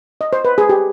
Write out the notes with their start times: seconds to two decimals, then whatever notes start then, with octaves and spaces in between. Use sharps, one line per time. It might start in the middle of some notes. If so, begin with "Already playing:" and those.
0.21 D#5
0.33 C5
0.45 B4
0.58 G#4
0.69 G4